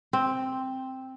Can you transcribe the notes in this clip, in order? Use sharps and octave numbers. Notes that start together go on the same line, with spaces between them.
C4